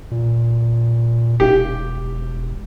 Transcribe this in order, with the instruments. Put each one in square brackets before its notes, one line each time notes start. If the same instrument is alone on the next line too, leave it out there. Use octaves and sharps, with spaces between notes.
[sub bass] A#2
[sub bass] E1 [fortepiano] G4